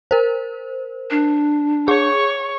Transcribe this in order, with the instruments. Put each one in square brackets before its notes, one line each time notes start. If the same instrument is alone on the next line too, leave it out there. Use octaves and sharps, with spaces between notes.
[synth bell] A#4 C5
[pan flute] D4
[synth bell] G#4 [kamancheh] C#5 C#6